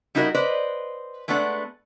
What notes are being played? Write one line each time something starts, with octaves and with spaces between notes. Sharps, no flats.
G3 D#4 E4 F#4 A#4 D#5
B4 C5 D5 D#5
G#3 A3 B3 D4 A4 F#5